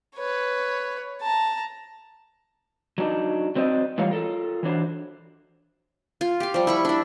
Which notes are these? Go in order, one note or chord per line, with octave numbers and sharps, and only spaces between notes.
B4 C#5
A5 A#5
F#3 D4 D#4
F#3 C4 C5 D5 D#5
A2 E3 G3 F4 C#5 F5
F4 A4 A#4
E3 F#3 D4 C5
F4
G4 F5
F3 G3
E4 B5 C#6
D4 E4